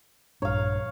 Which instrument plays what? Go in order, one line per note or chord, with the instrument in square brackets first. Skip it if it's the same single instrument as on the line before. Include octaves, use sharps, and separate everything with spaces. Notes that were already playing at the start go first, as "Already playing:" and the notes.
[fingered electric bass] A#1 G2 D4 [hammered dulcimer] C#5 F5